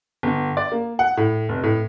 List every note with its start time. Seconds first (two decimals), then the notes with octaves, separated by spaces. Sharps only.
0.23 G1
0.57 D5
0.72 A#3
0.99 F#5
1.17 A2
1.49 F1
1.63 A2